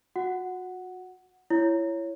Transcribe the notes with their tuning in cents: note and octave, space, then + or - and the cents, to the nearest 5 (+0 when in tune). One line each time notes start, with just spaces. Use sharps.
F#4 -30 F#5 +0
E4 +25 C#5 +0